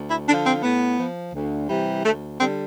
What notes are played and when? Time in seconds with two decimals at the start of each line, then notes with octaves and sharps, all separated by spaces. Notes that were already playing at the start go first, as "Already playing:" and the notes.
Already playing: D2
0.10 E4
0.28 D3 F3 D4
0.46 C4
0.63 A2 B3
0.98 F3
1.34 D2
1.69 C3 E3 G3
2.04 D2 A3
2.39 D3 G3 C4